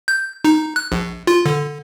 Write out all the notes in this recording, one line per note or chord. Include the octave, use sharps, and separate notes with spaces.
G6
D#4
F#6
A#1
F4
D3